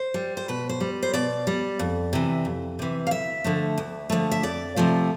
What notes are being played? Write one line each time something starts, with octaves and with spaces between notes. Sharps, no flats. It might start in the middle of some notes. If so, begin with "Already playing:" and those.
Already playing: C5
G3
C5
B2 B4
C5
G3
C5
B2 D5
G3
F2
C3 E3
F2
C3 E3
F5
D2 E5
D3 F3 A3
D2
D3 F3 A3
E5
F2 D5
C3 F3 A3